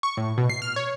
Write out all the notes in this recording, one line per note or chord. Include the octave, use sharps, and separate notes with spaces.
C#6
A2
B2
C7
F6
C#5